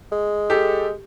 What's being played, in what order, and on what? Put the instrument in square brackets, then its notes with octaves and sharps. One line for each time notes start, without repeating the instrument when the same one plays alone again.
[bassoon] G#3
[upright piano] G4 A4